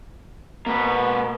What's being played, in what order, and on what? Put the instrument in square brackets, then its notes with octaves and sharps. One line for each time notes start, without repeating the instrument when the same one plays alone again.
[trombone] B2 [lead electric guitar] A#3 B4